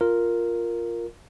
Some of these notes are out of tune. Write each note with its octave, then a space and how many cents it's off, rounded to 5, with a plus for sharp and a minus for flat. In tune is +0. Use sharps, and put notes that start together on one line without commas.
F4 +0 A#4 +0